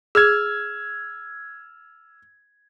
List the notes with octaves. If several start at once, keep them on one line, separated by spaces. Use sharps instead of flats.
G#4 E6 F6 G#6